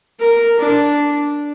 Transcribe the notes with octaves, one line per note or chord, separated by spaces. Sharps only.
A#4
D4